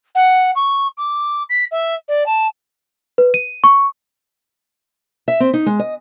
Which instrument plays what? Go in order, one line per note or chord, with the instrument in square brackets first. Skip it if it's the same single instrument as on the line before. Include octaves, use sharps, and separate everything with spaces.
[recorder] F#5
C#6
D6
B6
E5
D5
A5
[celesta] B4
D#7
C#6
[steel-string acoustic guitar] E5
C4
D#4
G#3
D#5